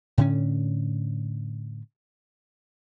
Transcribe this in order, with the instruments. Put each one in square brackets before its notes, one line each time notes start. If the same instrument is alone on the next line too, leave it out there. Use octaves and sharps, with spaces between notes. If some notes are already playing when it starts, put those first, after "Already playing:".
[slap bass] A2 D3 C#4